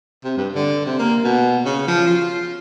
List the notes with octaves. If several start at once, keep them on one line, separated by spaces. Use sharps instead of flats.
C3
G2
D3
C3
A#3
B2
C#3
F3
F4